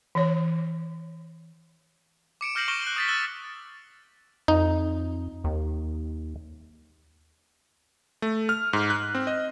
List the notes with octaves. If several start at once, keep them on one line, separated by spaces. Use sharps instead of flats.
E3 C#5
D6 C#7 D7 E7
D6 F6 G6 A#6 C7 F#7
C#6 F6 A#6 D7 E7 G7
F#6 G7
D#6 A6 B6
E6 F#6 A6 A#6 D7 G7
F2 D#4
D#2
A3
F6
G#2
F#6
C4
D#5